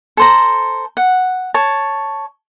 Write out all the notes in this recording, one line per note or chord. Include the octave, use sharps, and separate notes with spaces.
A4 C5 A#5
F#5
C#5 A5